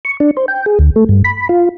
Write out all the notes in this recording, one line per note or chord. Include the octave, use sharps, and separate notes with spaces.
C#6
D4
C5
G5
G#4
D2
A3
G2
B5
F4